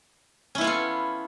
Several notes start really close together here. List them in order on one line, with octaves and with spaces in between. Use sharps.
C#4 E4 B3 F4 A4